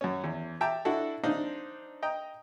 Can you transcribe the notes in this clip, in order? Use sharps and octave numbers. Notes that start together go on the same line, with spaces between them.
F#2 C#4
E2
E5 G5 A5 A#5 D6
D4 E4 F#4 A4
C4 D4 D#4 C5 D#5 F5
D#5 G5 A#5